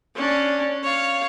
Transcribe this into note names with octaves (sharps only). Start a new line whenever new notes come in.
C#4 D4
C#5 F5